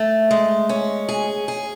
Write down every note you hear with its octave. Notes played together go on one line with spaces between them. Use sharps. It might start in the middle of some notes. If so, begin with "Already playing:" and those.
Already playing: A3
G#3
C#4
G#4
G#4